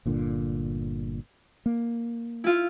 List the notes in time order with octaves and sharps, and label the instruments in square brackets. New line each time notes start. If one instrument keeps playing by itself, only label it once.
[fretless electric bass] G1 A#2 D3
A#3
[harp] E4 F4